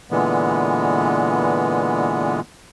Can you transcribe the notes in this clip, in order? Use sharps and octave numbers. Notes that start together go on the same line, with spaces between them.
A#2 D3 E3 G#3 B3